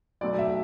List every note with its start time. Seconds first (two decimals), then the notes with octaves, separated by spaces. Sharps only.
0.21 B1 B2 A3 D5
0.39 E5